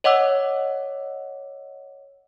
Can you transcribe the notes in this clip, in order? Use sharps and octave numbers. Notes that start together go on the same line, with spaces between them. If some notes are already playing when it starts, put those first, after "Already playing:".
C#5 D#5 F#5 D6 E6